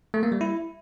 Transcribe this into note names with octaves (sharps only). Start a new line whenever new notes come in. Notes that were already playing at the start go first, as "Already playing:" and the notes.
A3
A#3
G3
E4